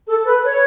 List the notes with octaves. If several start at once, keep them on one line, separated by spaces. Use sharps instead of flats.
A4
B4
C#5